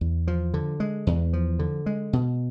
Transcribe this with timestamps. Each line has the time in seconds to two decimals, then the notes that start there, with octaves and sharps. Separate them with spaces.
0.01 E2
0.27 F3
0.54 D3
0.80 G#3
1.07 E2
1.33 F3
1.59 D3
1.86 G#3
2.13 B2